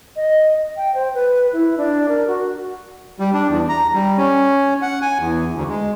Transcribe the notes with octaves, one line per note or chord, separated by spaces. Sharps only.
D#5
G5
C5
B4
E4
D4
A#4
F#4
G3
D4
E2
A#5
G3
C#4
F#5
G#5
E2
D2
G#3